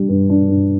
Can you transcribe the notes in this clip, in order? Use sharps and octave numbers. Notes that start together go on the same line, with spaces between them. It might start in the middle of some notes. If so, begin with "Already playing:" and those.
Already playing: G3 D4
G2
D4
G2